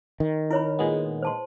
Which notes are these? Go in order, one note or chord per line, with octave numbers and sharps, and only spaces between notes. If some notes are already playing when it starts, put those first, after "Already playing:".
D#3
E4 A#4 C#5 B5
A#2 G#3 B3
C5 A5 C6